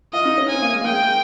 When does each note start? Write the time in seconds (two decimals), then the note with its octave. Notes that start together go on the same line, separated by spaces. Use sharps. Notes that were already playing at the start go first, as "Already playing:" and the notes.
0.13 F4 D#5
0.25 D#4
0.38 C#4
0.49 C4 G#5
0.62 A#3
0.73 G#3
0.81 A#3
0.85 G#3 G5